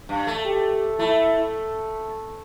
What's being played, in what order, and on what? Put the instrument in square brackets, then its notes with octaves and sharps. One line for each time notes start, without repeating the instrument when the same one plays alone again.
[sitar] G2
A3
[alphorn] G4
[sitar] A3 [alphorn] E4